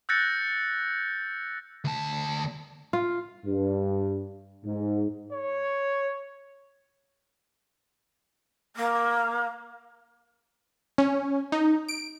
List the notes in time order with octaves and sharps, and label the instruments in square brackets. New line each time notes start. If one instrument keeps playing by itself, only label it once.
[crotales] E6 F#6 G6 A6 A#6 C#7
[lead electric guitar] D2 A5
[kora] F4
[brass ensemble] G2
G#2
[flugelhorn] C#5
[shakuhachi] A#3
[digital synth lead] C#4
D#4
D7